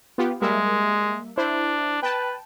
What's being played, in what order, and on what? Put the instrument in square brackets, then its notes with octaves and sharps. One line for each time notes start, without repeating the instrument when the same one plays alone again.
[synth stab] B3 F4 G4
[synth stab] G3 A#3 E5 [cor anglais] G#3
[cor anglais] D4 [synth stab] E4 C5
[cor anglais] B4 [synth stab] G5 A5